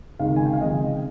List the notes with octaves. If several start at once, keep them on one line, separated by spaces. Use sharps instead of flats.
C#2 C3 D#3 F5
G#5
G5
F5
C#2 C3 F3 D#5